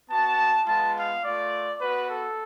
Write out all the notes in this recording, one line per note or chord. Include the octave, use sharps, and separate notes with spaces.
B3 F#4 A5
G#3 B3 F4 A5
F5
A3 F4 D5
B3 F#4 B4
A4